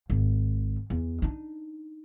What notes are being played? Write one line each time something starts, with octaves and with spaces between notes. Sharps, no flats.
G#1
E2
D4 D#4